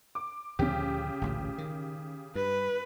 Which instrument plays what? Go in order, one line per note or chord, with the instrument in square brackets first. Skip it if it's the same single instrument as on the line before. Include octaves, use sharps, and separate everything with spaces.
[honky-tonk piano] D6
[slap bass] D2 A#2 F3 [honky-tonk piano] C#3 G4
[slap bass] A1 D2 A#2
D#3
[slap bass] G2 [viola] B4